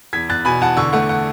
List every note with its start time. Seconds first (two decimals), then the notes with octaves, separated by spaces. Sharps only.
0.13 E2 G#6 B6
0.29 E2 F#6 A6
0.45 B2 G#5 B5
0.61 E2 F#5 A5
0.77 D3 C#6 E6
0.93 A3 F#5
1.09 F#5